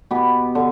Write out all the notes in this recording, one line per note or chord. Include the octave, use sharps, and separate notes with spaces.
B2 B3 G4
D3